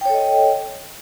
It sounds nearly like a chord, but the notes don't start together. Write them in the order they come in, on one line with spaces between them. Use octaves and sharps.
G5 C#5 A4 D#5